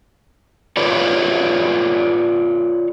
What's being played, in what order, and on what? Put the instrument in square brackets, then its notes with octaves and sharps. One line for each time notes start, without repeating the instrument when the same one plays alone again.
[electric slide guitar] F4 A4 B4 C#5 D5